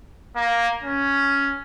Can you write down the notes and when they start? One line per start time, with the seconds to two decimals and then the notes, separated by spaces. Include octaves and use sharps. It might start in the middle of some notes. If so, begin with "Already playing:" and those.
0.36 A#3
0.84 C#4